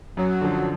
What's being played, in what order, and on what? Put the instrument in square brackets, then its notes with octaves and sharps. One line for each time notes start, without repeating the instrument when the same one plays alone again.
[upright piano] F#2 [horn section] F#3
[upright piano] D3 F3